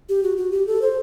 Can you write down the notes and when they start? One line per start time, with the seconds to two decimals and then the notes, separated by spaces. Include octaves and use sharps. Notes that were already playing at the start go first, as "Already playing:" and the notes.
0.09 G4
0.23 F#4
0.37 F#4
0.52 G4
0.67 A4
0.82 C5